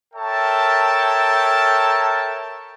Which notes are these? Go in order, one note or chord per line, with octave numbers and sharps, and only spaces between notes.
A4 A#4 C#5 E5 G5 A5